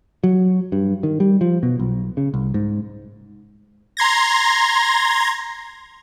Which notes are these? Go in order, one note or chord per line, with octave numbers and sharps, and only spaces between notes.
F#3
G2
D#3
G3
F3
B2
B1
C#3
C2
G#2
A#5 C6 G#6 A#6